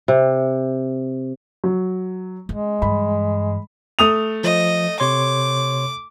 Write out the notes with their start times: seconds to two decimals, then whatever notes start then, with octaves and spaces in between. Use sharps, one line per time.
0.08 C3
1.64 F#3
2.49 G#3 C#4
2.82 G2 E3 B5
3.99 A3 D#6 F7
4.44 F3 D#5
5.00 C3 C#5 C6 D6